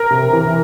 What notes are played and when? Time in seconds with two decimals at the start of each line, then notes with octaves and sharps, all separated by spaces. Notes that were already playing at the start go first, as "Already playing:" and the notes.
Already playing: A#4
0.11 C3
0.33 E3